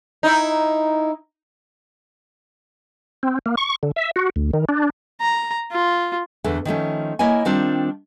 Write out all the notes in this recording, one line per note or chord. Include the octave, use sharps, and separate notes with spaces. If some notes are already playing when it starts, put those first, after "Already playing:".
D#4 E4
C4
A#3
C#6
D3
E5
F#4
D2
D#3
D4
A#5
F4
E2 D3 A3
D#3 F3 A3 C#4
A#3 E4 C#5 D#5 G#5
D#3 G3 C4 D4 F4